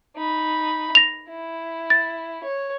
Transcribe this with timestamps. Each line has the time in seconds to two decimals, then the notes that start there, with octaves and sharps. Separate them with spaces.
0.17 D#4 B5
0.95 A#6 F7
1.29 E4
1.90 A6
2.43 C#5